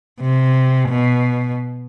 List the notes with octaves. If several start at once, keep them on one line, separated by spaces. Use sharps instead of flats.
C3
B2